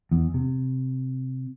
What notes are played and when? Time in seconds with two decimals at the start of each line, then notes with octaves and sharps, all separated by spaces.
0.11 E2
0.34 C3